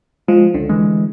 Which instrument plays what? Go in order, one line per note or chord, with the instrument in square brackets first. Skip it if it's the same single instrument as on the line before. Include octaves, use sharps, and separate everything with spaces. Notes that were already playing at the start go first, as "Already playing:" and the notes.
[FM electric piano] F3 [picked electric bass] G#3
[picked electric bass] C#2 [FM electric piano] D3
[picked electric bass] E3 G#3